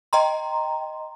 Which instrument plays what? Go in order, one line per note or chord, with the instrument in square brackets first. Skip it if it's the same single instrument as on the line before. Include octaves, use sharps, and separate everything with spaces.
[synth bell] D#5 G5 A#5 C6